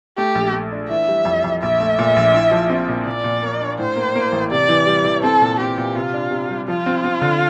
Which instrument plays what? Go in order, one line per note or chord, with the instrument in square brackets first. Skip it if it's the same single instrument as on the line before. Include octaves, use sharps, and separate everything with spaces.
[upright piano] A3 [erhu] G4
[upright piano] A#1
A3
D4
[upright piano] E3 [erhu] E5
[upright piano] G3
F2
F2
[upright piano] A#1 [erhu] E5
[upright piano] A3
A#2
A#1
E4
F3
C4
A#2
[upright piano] A#2 [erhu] D5
[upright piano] A#2
A#3
D4
[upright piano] A2 [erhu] C5
[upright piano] A#3
A#3
A1
[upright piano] C3 [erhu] D5
[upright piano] E3
G3
E3
[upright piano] C4 [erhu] A4
[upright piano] A#2
[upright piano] C4 [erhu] G4
[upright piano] A#2
[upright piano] C3 [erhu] F4
[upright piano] D4
C3
G3
[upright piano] F3 [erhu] F4
[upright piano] C4
C4
D3